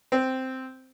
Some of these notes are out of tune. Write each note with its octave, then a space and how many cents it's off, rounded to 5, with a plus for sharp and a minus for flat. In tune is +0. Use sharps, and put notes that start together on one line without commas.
C4 -5